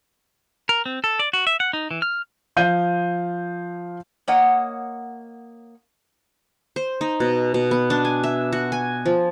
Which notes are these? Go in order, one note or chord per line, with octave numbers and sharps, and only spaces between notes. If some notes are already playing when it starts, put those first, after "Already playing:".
A#4
C4
A4
D5
F#4
E5
F#5
D#4
E3
F6
F3 F5 G6 D#7
A#3 C#5 D#5 F#5
C5
D#4
B2
B2
B3
D4
G#5
E5
F#4
G#5
F3